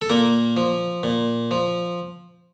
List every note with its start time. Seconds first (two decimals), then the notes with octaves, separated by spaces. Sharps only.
0.02 A4
0.10 A#2 A#3 A#4
0.57 F3
1.03 A#2
1.51 F3